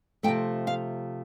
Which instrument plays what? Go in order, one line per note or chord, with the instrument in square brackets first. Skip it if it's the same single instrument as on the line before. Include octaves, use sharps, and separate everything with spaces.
[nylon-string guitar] C3 F3 A3 G5
F5